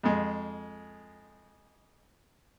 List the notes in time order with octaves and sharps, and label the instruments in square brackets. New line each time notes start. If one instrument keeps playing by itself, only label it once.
[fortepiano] F2 G#3